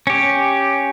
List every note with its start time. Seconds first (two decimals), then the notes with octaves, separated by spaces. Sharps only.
0.07 C#4 G4